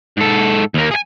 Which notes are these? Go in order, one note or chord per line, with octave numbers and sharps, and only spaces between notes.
G#2 A4
D#2 A#3
G#4 G#5